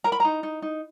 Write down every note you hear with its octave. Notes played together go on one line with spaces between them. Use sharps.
A#4 A#5
B5
D#4 A#5
D#4
D#4